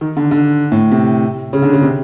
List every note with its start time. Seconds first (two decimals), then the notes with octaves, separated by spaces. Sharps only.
0.01 D#3
0.17 D3
0.31 D3
0.72 A2
0.91 C3
1.53 C#3
1.62 D3
1.73 C#3
1.82 C3